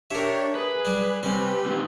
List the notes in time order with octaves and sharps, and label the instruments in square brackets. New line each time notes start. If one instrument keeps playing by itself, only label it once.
[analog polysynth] D4 G4 C#5 [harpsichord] A#4 E5
[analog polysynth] G#4 [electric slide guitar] B4
[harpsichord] G3 D4
[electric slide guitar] C3 C4 [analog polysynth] G3 G4 B4 [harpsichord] C#4
[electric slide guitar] A#2 D#3 C4